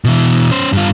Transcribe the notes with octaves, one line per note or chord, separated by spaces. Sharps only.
B2 E3
C#4 C5
G2 F4